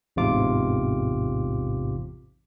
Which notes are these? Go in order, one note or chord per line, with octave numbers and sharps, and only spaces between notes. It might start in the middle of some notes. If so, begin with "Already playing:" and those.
A1 E2 G#2 C3 F4 D6